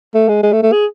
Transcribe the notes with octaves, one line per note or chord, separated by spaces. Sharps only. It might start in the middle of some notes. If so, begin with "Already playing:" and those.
A3
G#3
G#3
A3
A3
G#4